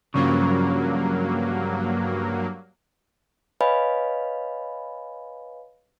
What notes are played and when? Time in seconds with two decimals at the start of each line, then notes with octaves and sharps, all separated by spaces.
0.14 G2 C#3 F3 F#3 A#3
3.61 B4 C#5 D#5 F5 G#5 B5